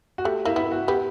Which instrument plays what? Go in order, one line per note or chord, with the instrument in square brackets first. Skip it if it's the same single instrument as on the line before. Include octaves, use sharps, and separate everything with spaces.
[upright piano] F#4
[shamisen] A3 [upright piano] G4
[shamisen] A#3 [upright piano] E4
[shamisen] B3 [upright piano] E4
[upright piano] F#4
[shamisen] B3 [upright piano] G4